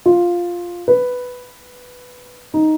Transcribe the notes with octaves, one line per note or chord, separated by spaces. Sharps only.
F4
B4
D#4